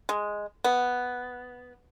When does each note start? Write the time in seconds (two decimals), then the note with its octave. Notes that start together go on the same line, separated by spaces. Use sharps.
0.09 G#3
0.64 B3